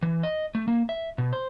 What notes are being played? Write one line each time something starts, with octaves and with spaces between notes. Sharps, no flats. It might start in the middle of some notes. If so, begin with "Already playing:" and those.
E3
D#5
A3
A#3
E5
B2
C5